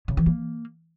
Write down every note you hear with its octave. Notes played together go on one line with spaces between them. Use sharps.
C#3
E3
A#3